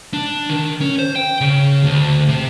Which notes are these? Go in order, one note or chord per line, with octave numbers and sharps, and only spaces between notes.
D4
D#3
C#4
C5
G5
C#3
D2
C3